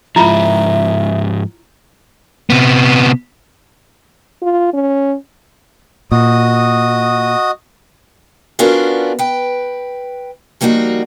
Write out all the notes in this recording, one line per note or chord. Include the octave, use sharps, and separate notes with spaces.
G#2 F3 E4 F4 E5 A#5
C3 B3
F4
C#4
A#2 F#4 D#5 D#6
B3 C#4 D4 F4 F#4 A#4
B4 G5
F3 G3 A#3 D#4 F#4